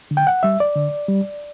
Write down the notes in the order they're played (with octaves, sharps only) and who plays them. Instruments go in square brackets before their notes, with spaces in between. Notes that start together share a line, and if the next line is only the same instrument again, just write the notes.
[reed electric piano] D3
G5
F#5
G3 E5
D5
D3
G3